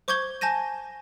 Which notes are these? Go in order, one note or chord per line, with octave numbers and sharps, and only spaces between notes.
C5 C#6 D6 G6 G#6 G7
G#5 A5 G6 A#6 D#7